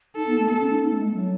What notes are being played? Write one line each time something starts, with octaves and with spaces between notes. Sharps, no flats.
D#4 A4
B3
A3
B3 A4
C#4
D#4
B3
A3
G#3
A3
F#3